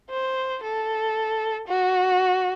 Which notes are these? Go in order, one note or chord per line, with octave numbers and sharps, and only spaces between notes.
C5
A4
F#4